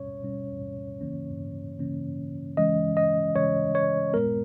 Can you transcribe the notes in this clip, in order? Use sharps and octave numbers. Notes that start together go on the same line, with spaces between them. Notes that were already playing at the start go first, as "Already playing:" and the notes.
Already playing: B2 G3 C#4 C#5
B2 G3 C#4
C#3 E3 A#3 C#4
C#3 E3 A#3 C#4
C#3 E3 G#3 C#4 D#5
D#5
C#3 E3 G#3 C#4 C#5
C#5
A#2 G#3 B3 A#4